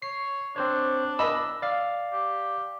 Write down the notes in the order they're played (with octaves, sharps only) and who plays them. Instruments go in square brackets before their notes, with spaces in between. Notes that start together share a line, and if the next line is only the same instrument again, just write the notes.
[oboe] C#5 [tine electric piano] C7
[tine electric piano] C4 C5 C#5 [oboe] D4
[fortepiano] D#5 B5 [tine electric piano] E6
[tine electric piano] D5 F5
[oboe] G4